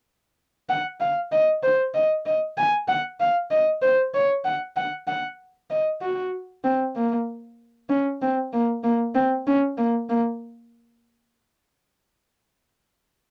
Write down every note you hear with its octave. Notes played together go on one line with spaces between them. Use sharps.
F#5
F5
D#5
C5
D#5
D#5
G#5
F#5
F5
D#5
C5
C#5
F#5
F#5
F#5
D#5
F#4
C4
A#3
C#4
C4
A#3
A#3
C4
C#4
A#3
A#3